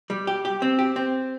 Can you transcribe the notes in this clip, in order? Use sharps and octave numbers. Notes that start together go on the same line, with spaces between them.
G3
G4
G4
C4
G4
C4